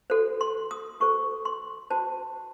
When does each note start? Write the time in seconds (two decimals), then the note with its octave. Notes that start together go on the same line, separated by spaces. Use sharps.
0.10 F#4 A4 C5
0.41 C6
0.71 D#6
1.00 F#4 A4 C5 C#6
1.45 C6
1.90 F#4 C5 A5